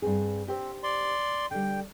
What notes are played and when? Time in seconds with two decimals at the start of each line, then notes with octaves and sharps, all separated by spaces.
0.02 G2 C4 G#4
0.48 C4 G4 C5
0.83 D5 C6
1.51 D3 G3 G5